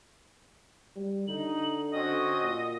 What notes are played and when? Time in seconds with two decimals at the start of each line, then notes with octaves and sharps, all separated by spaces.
0.96 G3
1.28 D3 D#4 F#7
1.91 C4 C#4 F#4 D#5
2.42 A#2